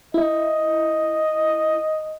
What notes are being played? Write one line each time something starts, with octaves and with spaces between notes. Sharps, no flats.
E4 D#5